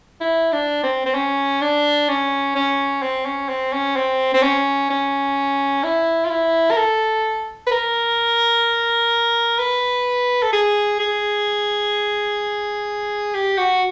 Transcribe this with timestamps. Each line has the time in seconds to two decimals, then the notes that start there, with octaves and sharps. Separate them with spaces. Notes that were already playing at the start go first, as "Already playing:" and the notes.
0.21 E4
0.52 D4
0.84 C4
1.06 C4
1.15 C#4
1.62 D4
2.08 C#4
2.55 C#4
3.02 C4
3.26 C#4
3.49 C4
3.73 C#4
3.96 C4
4.34 C4
4.43 C#4
4.90 C#4
5.84 E4
6.25 F4
6.30 E4
6.71 A#4
6.78 A4
7.67 B4
7.72 A#4
9.59 B4
10.43 A4
10.53 G#4
11.00 G#4
13.34 G4
13.58 F#4